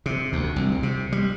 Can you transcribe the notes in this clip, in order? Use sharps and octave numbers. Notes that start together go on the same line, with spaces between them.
C3
D2
C2
C3
G3